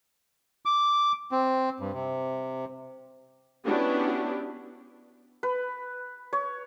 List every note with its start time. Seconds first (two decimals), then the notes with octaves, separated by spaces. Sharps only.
0.65 D6
1.32 C4
1.80 G2
1.93 C3
3.65 B3 C#4 D4 E4 F#4 G4
5.43 B4
6.33 C#5